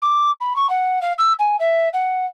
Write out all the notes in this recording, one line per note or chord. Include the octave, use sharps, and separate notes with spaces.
D6
B5
C#6
F#5
F5
E6
G#5
E5
F#5